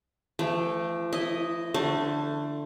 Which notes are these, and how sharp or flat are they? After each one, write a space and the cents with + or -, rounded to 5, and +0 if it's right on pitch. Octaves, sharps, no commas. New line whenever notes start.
F3 -45 A3 +0 G5 +10
E4 +0 D#5 +0
D3 +0 A3 +15 C6 +40